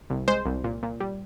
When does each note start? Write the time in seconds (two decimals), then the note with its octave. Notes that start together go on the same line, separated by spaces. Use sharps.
0.10 C2
0.28 G#3 C5
0.46 C2
0.64 A#2
0.83 A#2
1.00 G3